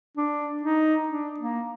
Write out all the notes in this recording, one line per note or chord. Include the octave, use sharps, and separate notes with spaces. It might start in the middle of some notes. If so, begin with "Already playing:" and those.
D4
D#4
D4
A#3